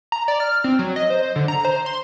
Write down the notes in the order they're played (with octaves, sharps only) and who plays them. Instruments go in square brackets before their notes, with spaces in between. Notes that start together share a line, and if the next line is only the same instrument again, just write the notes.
[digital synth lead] A#5
D5
F6
C4
F#3
D#5
C5
D3
A#5
C5
C6